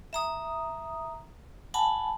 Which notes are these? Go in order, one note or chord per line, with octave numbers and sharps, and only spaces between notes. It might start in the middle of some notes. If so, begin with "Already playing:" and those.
E5 A#5 D#6
F#5 G#5 A5 B5